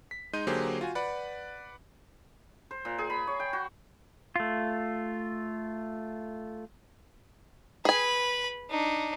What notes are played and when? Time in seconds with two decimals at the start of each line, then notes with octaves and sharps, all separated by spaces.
0.11 B6
0.33 G#3 D#4 C6 G6 D#7
0.47 D3 F#3 A#3 G4 G#4 C5
0.81 F4 F#4 G#5
0.95 B4 D5 F#5 B5
2.71 C5
2.85 A#2
2.98 G#4
3.10 B5
3.27 C#5
3.40 G5
3.53 F#4
4.36 A3 F4
7.85 G#4 B4 G#5 B5
8.70 D4 D#4